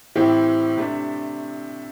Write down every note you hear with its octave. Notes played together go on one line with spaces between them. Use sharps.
A2 E3 C4 E4 G4
C3 A3 D4